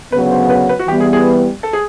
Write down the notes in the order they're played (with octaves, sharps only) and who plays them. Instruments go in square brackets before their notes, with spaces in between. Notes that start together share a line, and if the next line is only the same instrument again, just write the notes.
[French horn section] D2 C#3 F#3 B3 [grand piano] B4
[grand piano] C5
B4
B4
F#4
[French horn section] E3 G3 B3 [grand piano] G4
[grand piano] G#4
G#4
A4
G#4